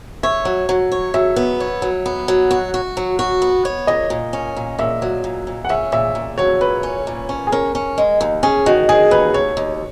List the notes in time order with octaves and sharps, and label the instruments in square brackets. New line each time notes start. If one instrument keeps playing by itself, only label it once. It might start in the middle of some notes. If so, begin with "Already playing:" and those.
[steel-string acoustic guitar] C#5 [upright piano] E5
[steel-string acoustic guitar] F#3
F#3
C#5
[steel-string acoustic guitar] F#3 [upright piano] E5
[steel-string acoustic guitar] B3
C#5
F#3
B3
F#3
F#4
F#4
F#3
F#4
B3
C#5
[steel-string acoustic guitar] A#2 [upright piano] D#5
[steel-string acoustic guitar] A#2
C#4
A#2
[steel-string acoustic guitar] A#2 [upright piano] E5
[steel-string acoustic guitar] F#3
A#2
A#2
[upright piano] F#5
[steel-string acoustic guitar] C#4 [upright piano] E5
[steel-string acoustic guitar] A#2 [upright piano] E5
[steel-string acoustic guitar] A#2
[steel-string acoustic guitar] F#3 [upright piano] C#5
[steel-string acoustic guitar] A#2 [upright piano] B4
[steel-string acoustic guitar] C#4
A#2
C#4
[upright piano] G#4
[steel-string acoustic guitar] C#4 [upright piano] A#4
[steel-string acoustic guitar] C#4
G#3
D#2
[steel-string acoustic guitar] C#4 [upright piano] G#4
[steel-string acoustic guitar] D#3 [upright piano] F#4
[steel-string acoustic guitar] D#3 [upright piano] G#4
[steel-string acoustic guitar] D#2 [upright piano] B4
[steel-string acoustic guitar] D#2 [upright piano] C#5
[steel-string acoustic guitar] D#2